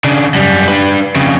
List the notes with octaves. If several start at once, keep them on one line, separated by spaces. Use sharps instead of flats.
C#3 D4
F#2 G3
D4 B4
F2 C#3